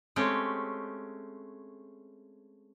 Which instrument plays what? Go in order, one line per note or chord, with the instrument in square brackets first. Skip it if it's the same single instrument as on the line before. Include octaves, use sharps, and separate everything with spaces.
[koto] G#3 A3 C4 C#4 G4